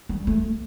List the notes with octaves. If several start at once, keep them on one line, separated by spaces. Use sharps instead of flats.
G3
A3